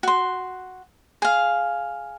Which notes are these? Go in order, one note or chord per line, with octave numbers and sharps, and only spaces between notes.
F#4 C6
G#4 F5